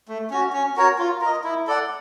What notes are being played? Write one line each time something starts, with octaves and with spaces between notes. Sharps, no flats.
A3
C#4 F#4
C#4
F#4 A#4 C#5
F4
A#4 D#5
E4
A4 D5 F#5